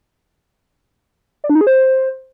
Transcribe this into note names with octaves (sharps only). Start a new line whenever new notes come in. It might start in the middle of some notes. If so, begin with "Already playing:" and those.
D5
D4
D#4
G#4
C5